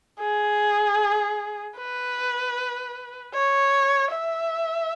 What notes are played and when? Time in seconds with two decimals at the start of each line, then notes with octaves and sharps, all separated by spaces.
0.20 G#4
1.78 B4
3.34 C#5
4.12 E5